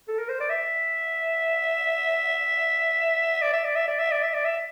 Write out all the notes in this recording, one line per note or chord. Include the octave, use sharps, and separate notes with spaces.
A4
A#4
C5
D5
E5
D5
E5
D5
E5
D5
E5
D5
E5
D5
E5